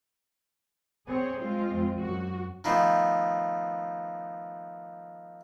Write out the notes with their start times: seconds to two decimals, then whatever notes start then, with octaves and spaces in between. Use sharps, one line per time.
1.07 C4 G#4 C#5
1.39 G#3 F4
1.70 F2 C4
1.99 F#2 F#4
2.64 D#3 F3 A3 B3 C5